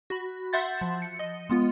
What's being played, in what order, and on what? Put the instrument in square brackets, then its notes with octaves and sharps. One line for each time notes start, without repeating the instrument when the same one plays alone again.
[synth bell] F#4 B5
E5 F#5 C6 G6 A6
F3
C#7
D#5
G#3 B3 F4